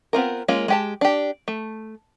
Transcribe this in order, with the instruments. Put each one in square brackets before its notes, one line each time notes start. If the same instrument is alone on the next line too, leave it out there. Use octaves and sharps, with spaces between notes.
[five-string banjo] B3 C4 F4 A#4
G#3 A#3 C#4 F4
G#3 G4 A5
D4 G4
A3